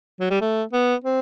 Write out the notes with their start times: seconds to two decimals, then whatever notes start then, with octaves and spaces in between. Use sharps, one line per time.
0.20 F#3
0.31 G3
0.41 A3
0.73 B3
1.04 C4